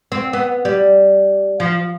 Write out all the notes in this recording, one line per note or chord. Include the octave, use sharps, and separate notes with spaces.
C4
B3
G3
F3